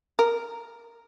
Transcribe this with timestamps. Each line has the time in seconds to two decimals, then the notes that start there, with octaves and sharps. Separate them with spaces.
0.19 A#4